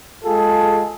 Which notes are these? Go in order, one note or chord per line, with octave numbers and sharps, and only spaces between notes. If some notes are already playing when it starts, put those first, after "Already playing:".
G#3 F4 G#4 A4